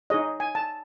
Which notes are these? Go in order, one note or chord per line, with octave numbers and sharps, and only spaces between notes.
D#4 G#4 C#5 D#5
G#5
A5